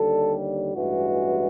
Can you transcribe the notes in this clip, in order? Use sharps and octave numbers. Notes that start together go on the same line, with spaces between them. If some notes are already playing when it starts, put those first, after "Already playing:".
Already playing: D#2 D3 G3 A4
A1 G2 E3 G#3 F#4